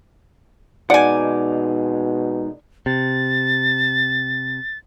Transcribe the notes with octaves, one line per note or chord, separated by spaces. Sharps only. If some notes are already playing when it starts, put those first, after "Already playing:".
B2 D#3 G#3 D#4 D5 F#5 G#5
C3 A6